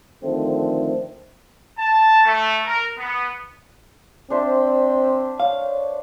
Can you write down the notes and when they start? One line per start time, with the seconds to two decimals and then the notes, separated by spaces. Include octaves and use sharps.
0.22 D3 D#3 F3 A3 C4
1.78 A5
2.24 A3
2.66 A#4
2.97 B3
4.30 C4 D4 C5 E5
5.40 C#5 F5